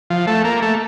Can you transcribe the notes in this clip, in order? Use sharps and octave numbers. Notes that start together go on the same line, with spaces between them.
F3
A3
A#3
A3